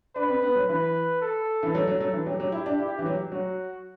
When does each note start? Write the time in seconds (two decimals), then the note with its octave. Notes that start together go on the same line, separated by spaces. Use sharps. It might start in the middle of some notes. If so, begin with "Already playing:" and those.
0.16 D4 B4
0.29 C4
0.42 B3
0.55 F#3
0.69 E3 B4
1.21 A4
1.63 E3
1.73 F#3 A4
1.88 F#3
2.00 F#3
2.13 E3
2.26 F#3 G4
2.40 F#3
2.52 E4
2.66 D4
2.79 E4
2.99 E3
3.06 F#3
3.32 F#3 F#4